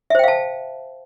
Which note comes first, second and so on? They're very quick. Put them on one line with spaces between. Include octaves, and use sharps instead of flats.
E5 C5 G5 F5 A5